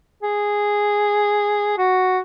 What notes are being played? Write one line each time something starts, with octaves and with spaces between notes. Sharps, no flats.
G#4
F#4